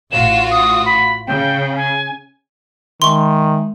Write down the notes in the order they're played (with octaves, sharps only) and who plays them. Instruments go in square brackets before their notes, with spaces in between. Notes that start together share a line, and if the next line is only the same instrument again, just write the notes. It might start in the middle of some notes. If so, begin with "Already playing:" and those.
[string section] A1 F4 F#4 [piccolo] E7
[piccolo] D#6
B5
[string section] C#3 [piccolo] G5
[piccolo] G#5
[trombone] D#3 [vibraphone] G#3 E5 [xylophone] C6 C#6